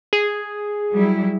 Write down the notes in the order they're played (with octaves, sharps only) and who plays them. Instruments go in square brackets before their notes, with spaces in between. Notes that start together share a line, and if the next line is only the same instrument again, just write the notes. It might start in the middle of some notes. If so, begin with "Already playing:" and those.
[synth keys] G#4
[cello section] F#3 G3 E4